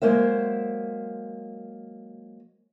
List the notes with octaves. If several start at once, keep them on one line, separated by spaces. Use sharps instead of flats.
F#3 G#3 A#3 C5 E5